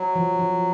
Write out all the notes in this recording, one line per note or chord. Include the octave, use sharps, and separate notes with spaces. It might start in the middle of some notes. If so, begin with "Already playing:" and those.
Already playing: F#3
F3
F3